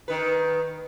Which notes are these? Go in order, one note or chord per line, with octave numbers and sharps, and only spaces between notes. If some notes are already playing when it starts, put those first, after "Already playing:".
D#3 B4